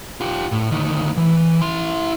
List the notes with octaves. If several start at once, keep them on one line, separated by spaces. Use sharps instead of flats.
F4 G4
A2
D2 D#3
E3
E4 C6